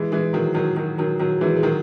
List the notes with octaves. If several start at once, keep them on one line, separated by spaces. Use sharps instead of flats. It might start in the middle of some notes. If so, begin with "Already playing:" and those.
Already playing: E3 G#3
E3 G#3
D#3 F#3
D#3 F#3
D#3 F#3
D#3 F#3
D#3 F#3
E3 G#3
G#3
D#3 F#3